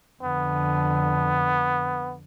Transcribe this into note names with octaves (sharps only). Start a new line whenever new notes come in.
F2 D3 B3